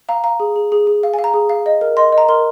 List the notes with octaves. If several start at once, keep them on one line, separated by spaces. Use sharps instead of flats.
F5 A#5
F5 A#5
G#4
G#4
G#4
G#4
F5
G#5
F5
A#5
G#4
F5
D#5
A#4
D#5 C6
D#5
A#5
A#4 C6